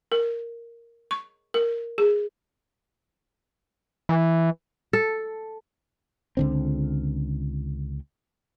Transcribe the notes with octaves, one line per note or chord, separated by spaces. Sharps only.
A#4
C#6
A#4
G#4
E3
A4
C#2 D3 C4